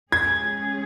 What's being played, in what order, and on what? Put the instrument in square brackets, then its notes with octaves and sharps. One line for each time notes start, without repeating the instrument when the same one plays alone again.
[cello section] G#3 C#4 G#4 [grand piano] G#6